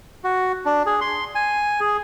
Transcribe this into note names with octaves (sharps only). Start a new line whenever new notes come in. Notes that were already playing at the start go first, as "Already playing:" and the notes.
F#4
D4
G#4
C6
G#5
G#4